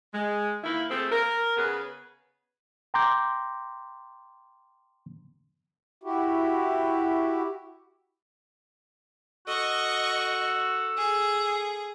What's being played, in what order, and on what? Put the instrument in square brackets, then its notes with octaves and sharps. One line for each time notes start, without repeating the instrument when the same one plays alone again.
[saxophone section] G#3
D#3 A#3 E4
F3 A3 C4 G#4 A4
A#4
C#3 B3 G#4 B4
[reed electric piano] G5 A#5 C6 D6 G6
[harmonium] E4 F#4 G4
[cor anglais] F#4 [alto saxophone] A4 [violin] D#5 C#6
[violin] G#4